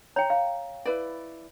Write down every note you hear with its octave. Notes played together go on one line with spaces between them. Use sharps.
C#5 G5 A#5
F5
E4 B4 D5